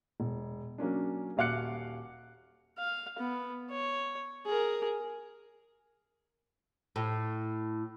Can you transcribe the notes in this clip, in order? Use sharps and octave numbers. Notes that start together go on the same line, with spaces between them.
E1
F#3 A#3 C#4 D4
D#1 F#4 F5 D6 F#6 C#7
F5
B3
C#5
G#4 A#4
A2